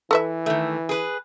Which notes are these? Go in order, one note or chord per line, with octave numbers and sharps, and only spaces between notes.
E3 A4 B4 E5
D#3 A3
G#4 B4